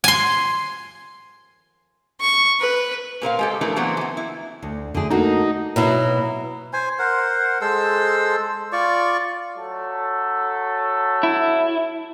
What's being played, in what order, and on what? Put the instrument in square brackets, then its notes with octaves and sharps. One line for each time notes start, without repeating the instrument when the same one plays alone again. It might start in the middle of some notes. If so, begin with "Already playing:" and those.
[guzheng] G#5 C6
[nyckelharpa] C#6
B4
[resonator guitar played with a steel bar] A#2 A#4 C5 F5
G#3 G4 A4
F3 A3 D4 E4 A#4 B4
E3 F#3 A#3 B3 C5
E3 B3
E4
[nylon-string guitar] D2
D3 A3 G#4
[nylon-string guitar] A#3 F#4 A4 [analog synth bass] D#4
[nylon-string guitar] B2 F#3 E4
[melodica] C5 G#5
A#4 C5 F#5
G#3 A4 C5 E6
F4 D5 C#6
[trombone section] F#3 A3 A4
[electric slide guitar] E4